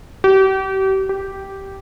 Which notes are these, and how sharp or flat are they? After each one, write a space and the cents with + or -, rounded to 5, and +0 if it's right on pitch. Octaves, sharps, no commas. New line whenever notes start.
G4 -40
G4 -10